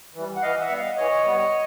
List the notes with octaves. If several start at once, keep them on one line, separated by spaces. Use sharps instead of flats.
E3 G3
F#5
E3 D#5 F5
E5 F#5
G3 B3
D#5 F5
E3 C#5 D#5
G3 B3